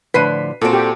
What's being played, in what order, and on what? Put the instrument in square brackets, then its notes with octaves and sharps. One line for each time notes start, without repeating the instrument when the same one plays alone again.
[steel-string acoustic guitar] A2 D3 F3 [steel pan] B4 [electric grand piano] B6 C7 D#7
[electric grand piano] A#2 F#4 D7 [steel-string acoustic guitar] C4 A4
[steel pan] G4